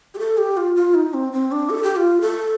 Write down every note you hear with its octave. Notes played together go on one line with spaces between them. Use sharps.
G4
A4
G4
F4
F4
D#4
C4
C4
D4
A4
G4
F4
A4